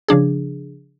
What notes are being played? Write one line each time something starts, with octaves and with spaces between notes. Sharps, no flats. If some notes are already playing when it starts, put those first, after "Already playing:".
C#3 F3 D4 G#4